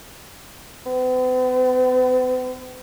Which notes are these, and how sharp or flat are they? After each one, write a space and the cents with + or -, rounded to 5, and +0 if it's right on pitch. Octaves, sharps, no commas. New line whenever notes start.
B3 +45